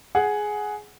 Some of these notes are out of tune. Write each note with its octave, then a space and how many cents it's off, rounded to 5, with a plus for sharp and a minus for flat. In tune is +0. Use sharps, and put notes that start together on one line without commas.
G#4 +10 F#5 +0